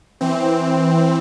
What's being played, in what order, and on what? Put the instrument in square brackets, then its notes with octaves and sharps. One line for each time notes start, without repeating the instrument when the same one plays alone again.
[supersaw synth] E3 C4